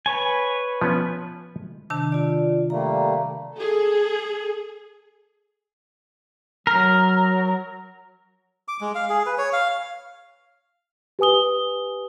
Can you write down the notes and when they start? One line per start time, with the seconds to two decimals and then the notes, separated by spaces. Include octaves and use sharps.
0.06 B4 C#5 G#5
0.81 F3 B3 C#4
1.90 C3 D#3 D4 A5
2.12 F4 D5
2.70 G3 A3 A#3 A#5
3.56 G#4 A4
6.67 F#3 A#4
8.68 D6
8.81 G#3
8.95 F5
9.09 G#4
9.26 B4
9.38 C#5
9.53 F5
11.19 G4 B4 G#5 D#6 G7